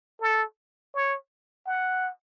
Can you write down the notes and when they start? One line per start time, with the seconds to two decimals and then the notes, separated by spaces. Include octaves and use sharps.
0.21 A4
0.94 C#5
1.67 F#5